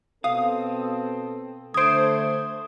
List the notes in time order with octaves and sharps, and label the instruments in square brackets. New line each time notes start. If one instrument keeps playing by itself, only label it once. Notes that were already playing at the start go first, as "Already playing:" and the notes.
[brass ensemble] B2 C4 A4 [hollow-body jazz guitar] F5 [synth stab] D#6
[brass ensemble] D3 A3 [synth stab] C5 G#6 [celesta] D#6 D7